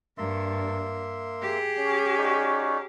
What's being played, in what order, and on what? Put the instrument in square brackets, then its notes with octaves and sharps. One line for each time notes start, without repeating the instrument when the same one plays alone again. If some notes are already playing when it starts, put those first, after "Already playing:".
[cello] G2 [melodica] A#3 E5 C6
[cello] G4 G#4
[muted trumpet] C#4
[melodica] D#4 F#4 D5